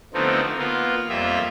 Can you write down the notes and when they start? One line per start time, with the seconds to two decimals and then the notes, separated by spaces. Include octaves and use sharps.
0.14 D3 F3 A3 B3 C4 D#4
0.58 A#3 B3 F4
1.09 F2 G3 A#3 F4 E5